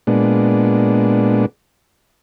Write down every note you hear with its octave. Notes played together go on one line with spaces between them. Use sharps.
A#2 G#3 B3 D4